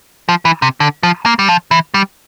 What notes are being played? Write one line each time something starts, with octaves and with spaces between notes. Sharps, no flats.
F3
E3
C3
D3
F3
A#3
G3
F3
E3
G3